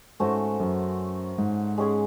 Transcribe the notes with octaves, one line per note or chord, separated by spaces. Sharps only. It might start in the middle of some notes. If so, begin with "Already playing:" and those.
G#2 A3 C#4 F#4 C5
F#2
G#2
G#3 C#4 G#4